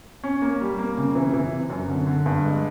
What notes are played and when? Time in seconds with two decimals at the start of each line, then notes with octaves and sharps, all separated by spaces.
0.24 C#4
0.42 A#3
0.61 G3
0.78 A#3
0.98 C#3
1.15 E3
1.34 E3
1.52 C3
1.70 F#2
1.88 D3
2.07 D3
2.26 G2
2.44 G#3